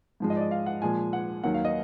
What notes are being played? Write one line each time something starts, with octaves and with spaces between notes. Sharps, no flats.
G#2 F3 G#3
D#5
D5
D#5
F5
F#5
A#2 F3 G#3 G#5
F#5
D#2 D#3 F#3 F#5
F5
D#5